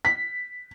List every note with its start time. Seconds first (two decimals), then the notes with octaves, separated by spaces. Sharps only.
0.05 B6